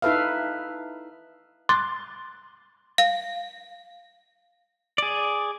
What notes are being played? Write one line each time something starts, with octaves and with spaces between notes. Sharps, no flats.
D#4 E4 A4 B4 E5 F5
C6 D6 F#6 A6
F5
G#4 D5